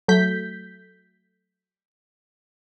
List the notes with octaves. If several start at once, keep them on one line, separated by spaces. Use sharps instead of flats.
F#3 A3 G6 B6